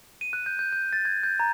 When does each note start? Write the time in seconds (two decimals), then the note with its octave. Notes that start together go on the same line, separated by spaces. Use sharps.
0.21 D#7
0.33 F#6
0.46 G6
0.59 G6
0.73 G6
0.93 A6
1.05 G#6
1.23 G6
1.40 A#5